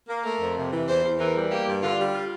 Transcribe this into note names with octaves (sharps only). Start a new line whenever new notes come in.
A#3
A3 A#4
F2
C3
E3
E2 C5
E2
E3 A#4
G3
A#3 G4
G2
D3 F4
G3
F4